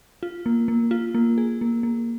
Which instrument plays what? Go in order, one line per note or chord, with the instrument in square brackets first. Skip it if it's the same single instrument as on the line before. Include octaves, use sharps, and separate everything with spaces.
[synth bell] F4
A#3
A#3
F4
A#3
G#4
A#3
A#3